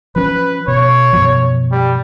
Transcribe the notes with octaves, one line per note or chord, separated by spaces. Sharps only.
F3 C#4 B4
B2 C#5
F#2 B2 F3
G3